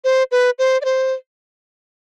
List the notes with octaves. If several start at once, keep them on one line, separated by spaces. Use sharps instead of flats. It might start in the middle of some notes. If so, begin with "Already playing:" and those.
C5
B4
C5
D5
C5